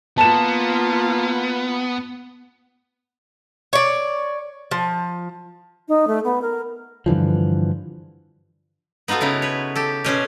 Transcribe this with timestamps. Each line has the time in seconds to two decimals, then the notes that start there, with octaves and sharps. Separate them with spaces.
0.18 A#3 B3 F4 A5 E7
3.73 C#5 D5
4.71 F3
5.88 D#4
6.07 A3
6.24 B3
6.42 A#4
7.06 G2 D3 E3 F3
9.08 B3 D#4 F4 F#4 A4
9.21 C#3 D#4 E4
9.42 B4 C#5
9.75 G4 A4
10.04 B2 C#4 C5 C#5